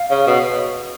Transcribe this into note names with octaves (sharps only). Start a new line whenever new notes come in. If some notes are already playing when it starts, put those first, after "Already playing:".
Already playing: F5
C#3
B2